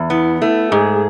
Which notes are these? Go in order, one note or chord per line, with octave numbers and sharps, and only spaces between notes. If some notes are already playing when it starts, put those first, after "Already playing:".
Already playing: E2
B3 E4
A3 E4
G#2 G#4